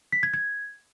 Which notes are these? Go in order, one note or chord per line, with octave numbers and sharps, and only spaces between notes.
B6
G#6
G#6